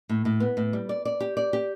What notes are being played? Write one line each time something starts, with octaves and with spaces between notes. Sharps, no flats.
A2
A2
B3
A2
G3
D5
D5
G4
D5
G4